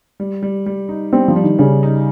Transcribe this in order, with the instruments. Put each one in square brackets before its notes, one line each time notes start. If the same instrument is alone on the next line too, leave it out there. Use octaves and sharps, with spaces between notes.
[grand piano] G3
G3
G3
D#4
[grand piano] G3 [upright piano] C4
[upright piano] F3
[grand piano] G3
[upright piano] D#3
[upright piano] C#3 [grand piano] G3
[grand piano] D#4